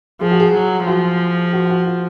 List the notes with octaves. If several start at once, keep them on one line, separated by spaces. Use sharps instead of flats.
F3 G#4
F#4
G#4
F#3
F3 F#4
F#4
F#4
F4